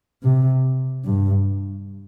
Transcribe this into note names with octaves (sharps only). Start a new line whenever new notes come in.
C3
G2